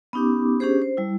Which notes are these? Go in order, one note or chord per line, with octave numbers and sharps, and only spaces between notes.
B3 C#4 D#4 G4 D6
C#4 D4 G4 G#4 C5
C5
G3 E4